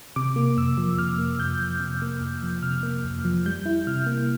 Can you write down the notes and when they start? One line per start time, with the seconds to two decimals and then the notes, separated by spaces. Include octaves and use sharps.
0.16 C3 D6
0.36 A#3
0.57 F2 E6
0.78 F3
0.99 C3 F6
1.18 A#3
1.39 F2 G6
1.60 F3
1.80 C3
2.02 A#3
2.21 F2
2.43 F3
2.62 C3 F6
2.83 A#3
3.04 F2
3.25 F3
3.46 G3 G6
3.66 E4
3.87 C3 F6
4.07 A#3